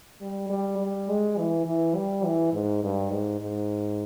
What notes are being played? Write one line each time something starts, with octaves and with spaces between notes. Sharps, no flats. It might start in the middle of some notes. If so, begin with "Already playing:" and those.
G3
G3
G3
G#3
E3
E3
G3
E3
G#2
G2
G#2
G#2